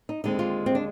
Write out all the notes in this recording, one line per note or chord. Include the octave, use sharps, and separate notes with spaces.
D#4
D#2 D3 G#3 C4 D#4
F4
C4
D4